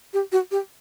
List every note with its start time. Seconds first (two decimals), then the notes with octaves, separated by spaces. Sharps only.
0.13 G4
0.32 F#4
0.51 G4